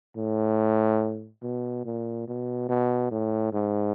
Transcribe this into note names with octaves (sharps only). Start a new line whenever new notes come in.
A2
B2
A#2
B2
B2
A2
G#2